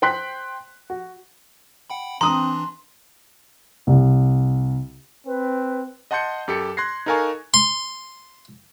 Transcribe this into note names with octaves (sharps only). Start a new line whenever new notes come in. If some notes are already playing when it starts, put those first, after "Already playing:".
C5 G5 C6 F#6 B6
F#4
F#5 G5 B5
E3 C4 D4 A#5 C6 D#6
C2
C4 B4
D#5 F#5 A5 C6 G6 C#7
F#2 G4 A4 C#7
C6 F#6 G#6 A#6 C7
D#4 A4 A#4 F5 G#5 C#6
C6